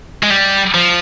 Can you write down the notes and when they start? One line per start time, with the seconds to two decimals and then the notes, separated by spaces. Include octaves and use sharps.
0.23 G#3
0.30 G3
0.74 F3